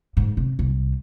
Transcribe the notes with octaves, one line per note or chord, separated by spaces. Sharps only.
G#2
C3
C2